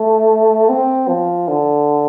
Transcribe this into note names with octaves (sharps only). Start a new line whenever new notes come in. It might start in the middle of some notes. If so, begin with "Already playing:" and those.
Already playing: A3
C4
F3
D3